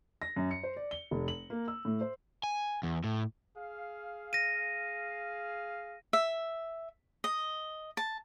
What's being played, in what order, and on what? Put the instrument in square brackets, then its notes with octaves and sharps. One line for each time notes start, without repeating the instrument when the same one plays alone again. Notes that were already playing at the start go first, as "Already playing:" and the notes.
[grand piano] A#6
F#2
C#7
C5
D5
G7
F1
F#7
A#3
E6
A2
C5
[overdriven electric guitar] G#5
E2
A2
[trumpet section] G#4 F5
[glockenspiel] A#6 D#7
[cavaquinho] E5
D#5
A5